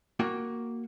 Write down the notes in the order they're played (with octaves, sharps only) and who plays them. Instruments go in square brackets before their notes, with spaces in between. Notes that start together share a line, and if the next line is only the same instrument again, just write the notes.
[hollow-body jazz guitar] A#3 F#4 G5